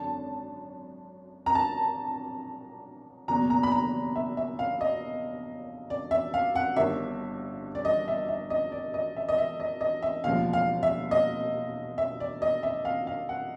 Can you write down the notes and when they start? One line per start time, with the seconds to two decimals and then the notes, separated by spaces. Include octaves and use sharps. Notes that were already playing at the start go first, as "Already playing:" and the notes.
Already playing: G#1 F#2 D3 A5
1.46 A#5
1.55 A5
3.28 F#1 E2 B2 A#5
3.50 A#5
3.63 B5
3.72 A#5
4.16 E5
4.37 E5
4.59 F5
4.81 D#5
5.90 D5
6.11 E5
6.34 F5
6.56 F#5
6.76 G1 G2 D#3 E5
7.75 D5
7.85 D#5
8.08 E5
8.29 E5
8.50 D#5
8.72 D5
8.94 D#5
9.16 E5
9.29 D#5
9.38 E5
9.60 D#5
9.81 D#5
10.03 E5
10.24 E1 D#2 C#3 F3 F5
10.53 F5
10.83 E5
11.11 D#5
11.98 E5
12.20 D5
12.42 D#5
12.63 E5
12.85 F5
13.07 F5
13.29 F#5